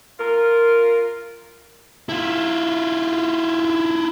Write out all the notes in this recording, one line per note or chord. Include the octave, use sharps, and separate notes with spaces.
F4 A#4
E4 F4